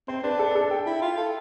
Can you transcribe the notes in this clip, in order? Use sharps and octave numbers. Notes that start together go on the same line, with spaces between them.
C4 C5
D4 B4
A4
A4
G5
E4
F4
A4